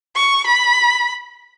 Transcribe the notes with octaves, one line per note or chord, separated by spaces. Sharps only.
C#6
B5